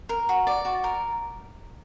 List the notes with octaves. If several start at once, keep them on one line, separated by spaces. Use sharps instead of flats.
A#4
F#4
D5
F#4
A#4